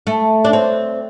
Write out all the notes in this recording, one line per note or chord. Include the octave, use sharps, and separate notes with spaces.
A3
D4
C4